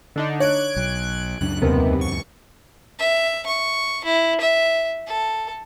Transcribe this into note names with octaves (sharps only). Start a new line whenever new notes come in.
D3 D4 D#4
C#5 F#6 G#6 D7
B1
C#2 F#2 D4 F#6
D#2 C3 B3 A#4
C#6
E5
C#6
E4
E5
A4